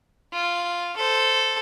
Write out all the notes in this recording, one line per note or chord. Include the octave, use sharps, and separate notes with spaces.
F4
A4 C5